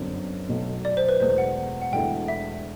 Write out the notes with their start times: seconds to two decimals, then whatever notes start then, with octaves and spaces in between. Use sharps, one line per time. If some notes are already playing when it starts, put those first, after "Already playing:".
Already playing: G1 F#2 D3 F#3 C4
0.49 B1 B2 F#3 A3
0.85 D5
0.97 C5
1.09 B4
1.20 E1 E2 B2 A3 C5
1.38 F#5
1.82 F#5
1.92 E1 E2 D3 A3 E4 G5
2.28 E5